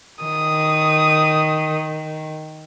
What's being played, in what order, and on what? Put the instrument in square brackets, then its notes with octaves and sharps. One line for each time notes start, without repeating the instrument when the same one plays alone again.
[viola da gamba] D#3 [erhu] D#6